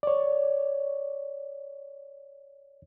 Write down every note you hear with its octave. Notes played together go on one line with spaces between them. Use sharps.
C#5 D5